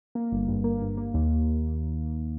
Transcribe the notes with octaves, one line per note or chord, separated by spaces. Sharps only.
A#3
G1
G2
A#3
G2
A#3
D#2